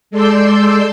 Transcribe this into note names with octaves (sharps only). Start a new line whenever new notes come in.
G#3 A4 D5 C6 E6 G6